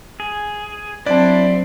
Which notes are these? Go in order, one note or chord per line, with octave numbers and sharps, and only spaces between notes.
G#4
F#3 C4 D4 E4 D5 A5